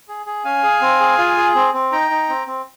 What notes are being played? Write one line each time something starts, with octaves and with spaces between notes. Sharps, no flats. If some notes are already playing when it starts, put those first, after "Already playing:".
G#4
G#4
C#4 F5 G#5
G#4
C4
G#4
F4
G#4
C4
C4
D#4 G5 A#5
D#4
C4
C4